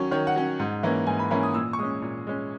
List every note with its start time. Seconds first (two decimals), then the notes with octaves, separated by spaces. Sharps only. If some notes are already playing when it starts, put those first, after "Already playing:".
Already playing: D#3 F#3 C#4 C#5
0.11 D#3 C#5
0.27 F#5
0.35 F#3 C#4
0.59 G#2
0.83 E3 A#3 C#4
1.07 G#2 G#5
1.19 B5
1.31 E3 A#3 C#4 B5
1.43 D#6
1.54 A#2 E6
1.73 C#6
1.79 G#3 C#4 D#6
2.02 A#2
2.27 G#3 C#4